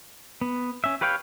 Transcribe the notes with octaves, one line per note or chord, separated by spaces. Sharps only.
B3
C#4 E5
G4 B4 C#5 F5 G5